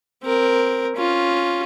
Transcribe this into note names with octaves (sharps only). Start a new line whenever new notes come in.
C4 A#4
C#4 F4